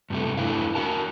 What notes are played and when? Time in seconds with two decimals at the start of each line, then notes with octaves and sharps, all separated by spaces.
0.10 G2 C3 G3 A3
0.37 E2 A3 D4 E4 B4 F5
0.75 F#4 A#4 A5